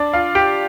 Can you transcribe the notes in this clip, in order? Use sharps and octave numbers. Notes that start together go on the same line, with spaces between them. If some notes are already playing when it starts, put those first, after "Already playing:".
Already playing: D4 D5
F4 F5
G4 G5